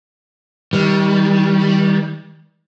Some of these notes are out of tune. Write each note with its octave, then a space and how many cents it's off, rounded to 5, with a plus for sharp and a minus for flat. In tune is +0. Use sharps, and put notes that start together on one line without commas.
D#3 +35 G3 +0